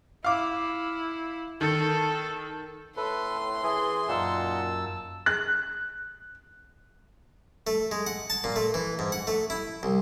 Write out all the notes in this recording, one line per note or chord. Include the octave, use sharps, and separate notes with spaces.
E4 F5 D6
D#3 A4
A2 A4 B4 C6
E3 G#4
F#2 A#2 D#4 F#5 A5 E6
F#6
A3
G#3
F#5
A5
A#2
A3
E3
G#2
F#5
A3
E4
C2